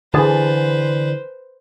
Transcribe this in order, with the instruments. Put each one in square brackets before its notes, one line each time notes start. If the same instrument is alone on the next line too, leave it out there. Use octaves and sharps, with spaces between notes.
[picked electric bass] D3 E3 [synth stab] G#4 A5 [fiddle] B4 C5